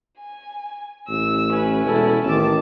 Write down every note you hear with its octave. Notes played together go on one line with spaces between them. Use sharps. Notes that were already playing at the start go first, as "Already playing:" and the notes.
G#5
A1 E6
C#4 B4
E1 E4 A4
A1 D#3 A5 D6